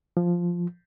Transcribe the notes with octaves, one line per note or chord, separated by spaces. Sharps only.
F3